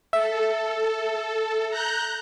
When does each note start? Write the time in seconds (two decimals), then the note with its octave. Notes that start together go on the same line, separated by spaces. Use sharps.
0.13 A4 E5
1.69 A#5 F#6 G6